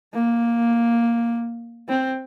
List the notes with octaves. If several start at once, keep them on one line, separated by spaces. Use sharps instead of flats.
A#3
C4